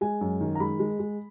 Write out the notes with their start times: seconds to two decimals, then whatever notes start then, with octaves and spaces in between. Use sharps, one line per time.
0.01 G#3 G#5
0.21 F#2
0.41 D#3
0.55 A#5
0.60 G#3 B5
0.80 G#3
0.99 G#3